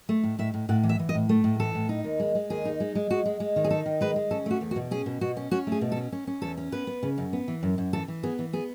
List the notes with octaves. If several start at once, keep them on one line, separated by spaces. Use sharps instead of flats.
A3
A2
A2 E5
A2
A2 F#5
E3
E5
E3
D#5
A2
A3
A2
E3 A4
A2
D#4
D#2
G#3
G#3
D#2 G#4
D#4
G#3
G#3
G#3 F#4
G#3
G#3
D#3
G#4
D#4 A4
D#3
G#3 B4
G#3
C#4 A4
A3 F#4
E2
F#4
B2
C#4 G#4
B2
B2 F#4
C#4
C#4 F#4
A3 G#4
B2
A4
C#4
C#4
C#4
E2 A4
C#4
B3 B4
B3
C#3
F#2
B3
E3
F#2
F#2
E3 A4
E3
B3 G#4
E3
B3 G#4